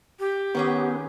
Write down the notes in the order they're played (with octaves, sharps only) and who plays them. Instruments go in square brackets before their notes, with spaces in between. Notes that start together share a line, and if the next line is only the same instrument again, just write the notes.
[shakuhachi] G4
[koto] D#3 C#4 G#4 [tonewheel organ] B3